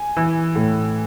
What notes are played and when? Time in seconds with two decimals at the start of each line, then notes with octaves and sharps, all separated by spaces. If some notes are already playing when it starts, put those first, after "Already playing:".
Already playing: G#5
0.17 E3
0.55 A2